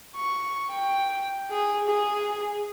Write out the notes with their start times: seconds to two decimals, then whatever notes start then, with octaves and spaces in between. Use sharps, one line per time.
0.16 C#6
0.71 G5
1.51 G#4
1.87 G#4